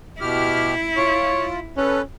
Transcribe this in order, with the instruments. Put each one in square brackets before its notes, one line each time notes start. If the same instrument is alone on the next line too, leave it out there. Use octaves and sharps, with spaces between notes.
[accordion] B2 G4 F6 [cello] E4
[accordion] F4 [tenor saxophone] C#5
[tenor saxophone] C#4 [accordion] A4 B4